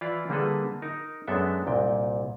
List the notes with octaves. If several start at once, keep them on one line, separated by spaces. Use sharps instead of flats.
E3 E4 F4 D5 F5
D3 G3 A#3 G#4 A4 B4
D#4 A#4
F#2 G#3 B3 D4 A4 E5
C2 A#2 G5